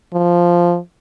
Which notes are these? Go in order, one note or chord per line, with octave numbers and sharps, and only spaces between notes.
F3